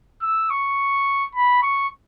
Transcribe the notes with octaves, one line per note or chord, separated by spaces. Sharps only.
E6
C#6
B5
C#6